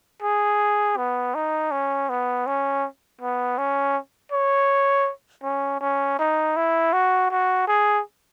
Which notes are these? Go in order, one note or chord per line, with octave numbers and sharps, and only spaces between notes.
G#4
B3
D#4
C#4
B3
C#4
B3
C#4
C#5
C#4
C#4
D#4
E4
F#4
F#4
G#4